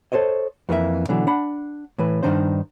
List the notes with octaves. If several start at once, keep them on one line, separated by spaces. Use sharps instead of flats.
A4 A#4 C5 C#5 D#5
F2 E3 A#3 F4 E5
B2 D3 E3 F#3
D4 F#5 B5
A2 E3 B4
G2 A#2 D#3 D4 D#4 C5